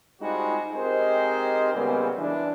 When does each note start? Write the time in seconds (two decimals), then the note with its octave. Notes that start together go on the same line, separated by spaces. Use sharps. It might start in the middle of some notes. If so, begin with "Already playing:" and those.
0.22 G3 G#3 C4 D#4 F4 F#4
0.74 G#3 C4 D#4 G4 A#4 C5
1.74 A#2 C#3 G3 G#3 B3 C4
2.18 E3 D4